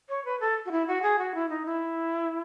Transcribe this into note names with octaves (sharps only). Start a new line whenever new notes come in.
C#5
B4
A4
F#4
E4
F#4
G#4
F#4
E4
D#4
E4